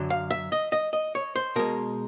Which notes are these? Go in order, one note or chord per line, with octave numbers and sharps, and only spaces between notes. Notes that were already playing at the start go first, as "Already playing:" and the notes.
Already playing: F#2 D3 F#3
F5
E5
D#5
D#5
D#5
C#5
C5
B2 G#3 A#4